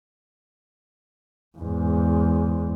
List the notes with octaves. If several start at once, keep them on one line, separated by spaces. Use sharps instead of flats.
E2 G#2